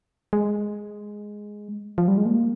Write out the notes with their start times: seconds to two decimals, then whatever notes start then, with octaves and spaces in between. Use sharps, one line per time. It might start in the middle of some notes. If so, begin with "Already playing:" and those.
0.33 G#3
1.98 F3
2.08 G3
2.17 G#3
2.26 A#3